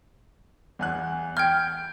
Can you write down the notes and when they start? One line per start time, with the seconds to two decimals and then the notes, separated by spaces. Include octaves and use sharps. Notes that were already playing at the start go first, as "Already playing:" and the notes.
0.79 E2 G#5 F#6
1.37 G5 F6 G6 G#6